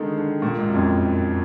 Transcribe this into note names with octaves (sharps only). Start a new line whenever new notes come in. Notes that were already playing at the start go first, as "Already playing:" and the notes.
Already playing: D3 D#3 G#3
D3
A#2
G#2
F#2
F2